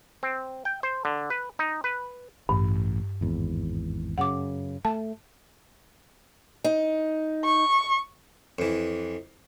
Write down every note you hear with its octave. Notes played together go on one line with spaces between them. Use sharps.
C4
G5
C5
D3
B4
D#4
B4
A1 G2
G#1 E2
F#2 C#3 F#5 D6
A3 A5
D#4
C#6
F2 E3